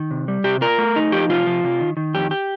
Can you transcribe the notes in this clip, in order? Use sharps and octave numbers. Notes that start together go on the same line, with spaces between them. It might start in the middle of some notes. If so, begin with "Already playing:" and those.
Already playing: D#3
C3
G3
C3 G4
F4 A#4
A3
D#4
F3 G4
C3 F4
F3
C3
D#3
D#3
F2 G4
G4